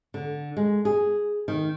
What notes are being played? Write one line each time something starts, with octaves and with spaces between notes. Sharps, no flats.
D3
G#3
G#4
D#3